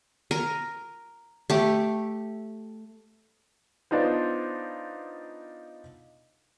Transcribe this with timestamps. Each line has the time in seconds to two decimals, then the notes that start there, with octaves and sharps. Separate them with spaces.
0.31 A#4
1.50 A3 G4
3.91 B3 D4 D#4 F4 C5